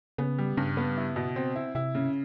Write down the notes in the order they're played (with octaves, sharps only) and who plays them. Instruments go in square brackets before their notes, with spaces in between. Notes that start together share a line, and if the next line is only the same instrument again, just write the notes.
[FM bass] C#3 [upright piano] B3
[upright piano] G3
[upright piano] G2 [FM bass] C#3
[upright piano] B3
E4
B2
C4
E4
[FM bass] C3 [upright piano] E4
[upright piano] C#3